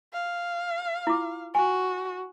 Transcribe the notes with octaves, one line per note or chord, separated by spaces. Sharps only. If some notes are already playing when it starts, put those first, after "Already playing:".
F5
E4 F4 D6
F#4 G#5